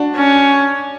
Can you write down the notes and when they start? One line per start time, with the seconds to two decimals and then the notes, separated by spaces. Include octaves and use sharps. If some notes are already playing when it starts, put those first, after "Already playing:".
Already playing: D4 F#4
0.16 C#4